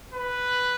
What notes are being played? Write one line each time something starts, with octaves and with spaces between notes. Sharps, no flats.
B4